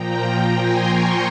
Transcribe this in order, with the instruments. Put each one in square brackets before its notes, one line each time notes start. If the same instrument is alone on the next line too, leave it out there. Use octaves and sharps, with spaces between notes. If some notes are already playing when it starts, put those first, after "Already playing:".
Already playing: [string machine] A#2 F3 G5 A#5
G5 A#5
G#5 C6
A#5 C#6